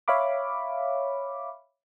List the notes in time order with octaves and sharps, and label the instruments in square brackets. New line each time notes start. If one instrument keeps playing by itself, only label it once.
[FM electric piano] C#5 E5 F5 B5 D6